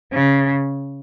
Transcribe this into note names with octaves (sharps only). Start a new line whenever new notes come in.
C#3